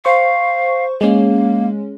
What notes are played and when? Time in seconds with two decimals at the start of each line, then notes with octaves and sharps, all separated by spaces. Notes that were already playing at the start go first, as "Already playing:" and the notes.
0.05 C5 F5 C#6
1.01 G#3 A#3 C#4